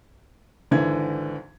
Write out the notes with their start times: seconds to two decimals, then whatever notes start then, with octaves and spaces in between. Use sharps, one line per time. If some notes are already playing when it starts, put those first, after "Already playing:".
0.71 G#1 D3 E3 G#6